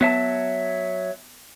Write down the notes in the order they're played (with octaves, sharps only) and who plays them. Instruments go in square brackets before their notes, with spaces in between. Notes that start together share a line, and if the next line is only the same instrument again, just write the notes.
[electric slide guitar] F#3 E5 A5 [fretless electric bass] B3